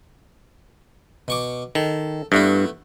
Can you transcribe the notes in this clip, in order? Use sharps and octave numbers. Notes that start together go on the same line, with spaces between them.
B2 C#6 D6
D#3 A4
G2 A3 B3 E4